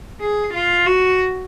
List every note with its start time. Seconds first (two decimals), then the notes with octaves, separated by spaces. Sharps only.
0.21 G#4
0.54 F4
0.86 F#4